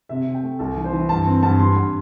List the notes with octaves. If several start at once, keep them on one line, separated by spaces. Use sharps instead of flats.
C3 E5
C3
G5
A3
C2 A4
E3
C5
E3
G2 A5
C4
G2 A5
G3 C6
G2